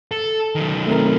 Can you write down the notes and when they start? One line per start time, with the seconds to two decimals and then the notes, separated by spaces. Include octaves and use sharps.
0.11 A4
0.56 D#3 F#3
0.87 A3 C4 A#4